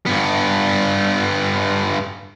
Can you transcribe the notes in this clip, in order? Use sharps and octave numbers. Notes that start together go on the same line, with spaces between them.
G2 B3